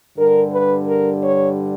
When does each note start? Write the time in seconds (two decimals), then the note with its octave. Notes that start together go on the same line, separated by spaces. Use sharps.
0.17 G2 D3 G3 A#4
0.52 B4
0.87 A#4
1.23 C#5